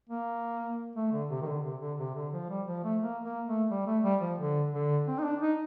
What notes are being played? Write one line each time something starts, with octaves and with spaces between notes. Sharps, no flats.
A#3
A3
D3
C3
D#3
D3
C3
D3
C3
D3
F3
G3
F3
A3
A#3
A#3
A3
G3
A3
G3
F3
D3
D3
C4
D#4
D4
D#4